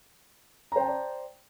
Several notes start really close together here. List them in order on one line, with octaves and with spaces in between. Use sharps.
A#5 C5 G5 A5 D5